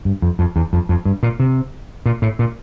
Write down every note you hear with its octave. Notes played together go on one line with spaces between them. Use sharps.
G2
F2
F2
E2
F2
F2
G2
A#2
C3
A#2
A2
A#2